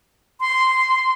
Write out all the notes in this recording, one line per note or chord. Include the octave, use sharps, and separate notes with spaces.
C6